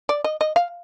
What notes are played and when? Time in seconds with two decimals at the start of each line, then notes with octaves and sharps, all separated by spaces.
0.09 D5
0.24 D#5
0.41 D#5
0.56 F5